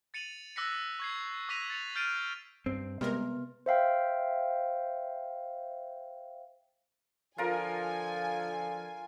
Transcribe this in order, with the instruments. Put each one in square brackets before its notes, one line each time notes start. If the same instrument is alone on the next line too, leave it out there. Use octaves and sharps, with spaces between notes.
[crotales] A6 C#7 D#7 F7 F#7
D6 E6 F#6 A#6 B6 C#7
C#6 G#6 C7
D6 E6 A#6 B6 D#7 F7
A6 C#7 F7
F6 G6 A6 C7 D7 D#7
[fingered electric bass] G2 [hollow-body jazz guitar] C4
[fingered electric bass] C3 [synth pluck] G3 G#3 A#4 [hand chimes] B3
[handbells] C5 E5 F5 G5
[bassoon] D3 [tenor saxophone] F3 [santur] F4 A#4 [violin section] G#5